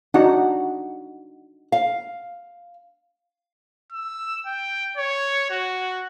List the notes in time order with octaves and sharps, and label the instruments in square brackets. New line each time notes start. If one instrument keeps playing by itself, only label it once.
[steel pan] D4 D#4 F#4 [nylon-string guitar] F#5
[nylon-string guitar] F5
[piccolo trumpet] E6
G5
C#5
F#4